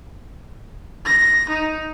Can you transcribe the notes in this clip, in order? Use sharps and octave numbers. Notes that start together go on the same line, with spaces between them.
A#6
D#4